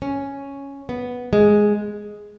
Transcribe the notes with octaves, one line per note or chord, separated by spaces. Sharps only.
C#4
B3
G#3